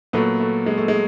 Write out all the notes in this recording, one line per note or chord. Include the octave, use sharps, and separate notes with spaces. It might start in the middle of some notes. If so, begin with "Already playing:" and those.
A#2 F#3 A3 B3
A3
G#3
A3
G#3